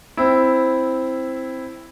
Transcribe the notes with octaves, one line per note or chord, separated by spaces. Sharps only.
C4 E4